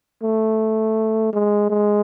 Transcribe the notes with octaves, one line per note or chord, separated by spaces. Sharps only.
A3
G#3
G#3